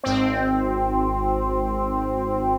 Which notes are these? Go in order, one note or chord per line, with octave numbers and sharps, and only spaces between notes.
G#1 C4